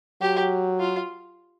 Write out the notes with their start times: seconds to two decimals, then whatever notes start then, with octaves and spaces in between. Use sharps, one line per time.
0.21 F#3 G4
0.80 F4